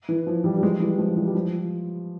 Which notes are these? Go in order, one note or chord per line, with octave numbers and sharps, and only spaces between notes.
E3
F3
E3 G3
G3
F3 G#3
E3 G3
F3 G#3
E3 G3
G3
F3